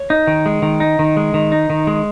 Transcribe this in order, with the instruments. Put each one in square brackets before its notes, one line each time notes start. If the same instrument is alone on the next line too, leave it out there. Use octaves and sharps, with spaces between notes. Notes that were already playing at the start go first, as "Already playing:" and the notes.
Already playing: [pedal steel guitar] C#5
D#4
D#3
G#3
D#3
D#4
D#3
G#3
D#3
D#4
D#3
G#3